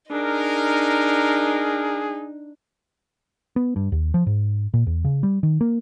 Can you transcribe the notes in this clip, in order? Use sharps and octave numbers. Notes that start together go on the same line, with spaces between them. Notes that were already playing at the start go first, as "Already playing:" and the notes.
D4 D#4 G#4 A#4
B3
G2
D#2
F3
G#2
A#2
E2
C#3
G3
D#3
A#3